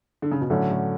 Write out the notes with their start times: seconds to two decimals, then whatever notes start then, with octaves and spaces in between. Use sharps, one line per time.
0.22 D3
0.31 C#3
0.41 B2
0.50 A2 D3 F#3 C#4
0.70 A2